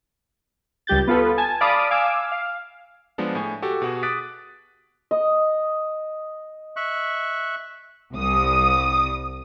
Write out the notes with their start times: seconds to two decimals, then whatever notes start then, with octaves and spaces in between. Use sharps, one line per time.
0.87 C#2 G3 G4 G6 A6
1.07 B3 F4 A4 B4
1.38 G#5 A5 G#6
1.61 D5 F5 A5 B5 D6 D#6
1.91 F5 G#5 D6 E6
2.32 F5
3.18 F3 G#3 B3 D4
3.35 A2 G#5
3.62 F#4 G4 A4
3.82 B2 F#4 G#4
4.03 D6 D#6 F#6 A6 B6 D7
5.11 D#5
6.76 E5 C#6 F#6
8.14 C2 D#6